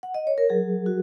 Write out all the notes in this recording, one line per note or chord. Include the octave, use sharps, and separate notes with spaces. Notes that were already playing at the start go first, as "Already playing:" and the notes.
F#5
D#5
C#5
A#4
F#3 G#4
F#4